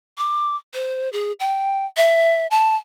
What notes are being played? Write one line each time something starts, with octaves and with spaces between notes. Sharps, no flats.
D6
C5
G#4
G5
E5
A5